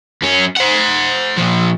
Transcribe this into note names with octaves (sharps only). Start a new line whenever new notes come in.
F#2 C#4
C5 F#5
A#2 F3